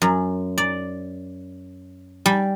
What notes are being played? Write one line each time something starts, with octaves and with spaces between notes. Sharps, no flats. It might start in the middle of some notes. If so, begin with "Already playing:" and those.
F#2
D5
G3